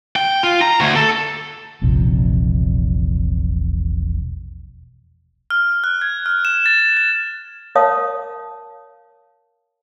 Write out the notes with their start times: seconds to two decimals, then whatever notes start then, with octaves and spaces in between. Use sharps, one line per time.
0.16 G5
0.43 F4
0.62 A#5
0.80 D2
0.96 A4
1.82 E1 A#1 C3 F3
5.50 F6
5.84 F#6
6.01 G#6
6.26 F6
6.45 E7
6.66 A6
6.80 E7
6.97 A6
7.75 A#4 C#5 F5 A5 D#6